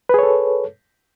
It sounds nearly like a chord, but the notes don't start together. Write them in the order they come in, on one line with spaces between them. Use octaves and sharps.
B4 G#4 C#5 A4